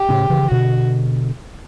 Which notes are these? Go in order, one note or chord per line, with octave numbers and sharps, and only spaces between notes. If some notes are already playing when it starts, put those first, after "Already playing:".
Already playing: G4
A2 C#3
C#3 E3
E3
B2 D3 F#4